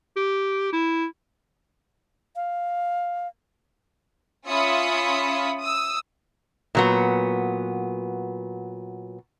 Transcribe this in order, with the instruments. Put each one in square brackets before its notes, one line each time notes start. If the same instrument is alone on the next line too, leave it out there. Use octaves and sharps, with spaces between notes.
[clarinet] G4
E4
[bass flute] F5
[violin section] C#4 F4 E5 B5 D#6 C#7
D#6 E6
[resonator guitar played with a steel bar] A#2 F#3 B3